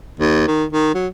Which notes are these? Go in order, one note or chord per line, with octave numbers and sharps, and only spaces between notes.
D#2
D#3
D#3
F#3